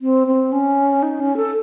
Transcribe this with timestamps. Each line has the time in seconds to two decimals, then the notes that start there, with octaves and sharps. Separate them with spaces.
0.01 C4
0.27 C4
0.52 C#4
1.03 D#4
1.20 C#4
1.37 A4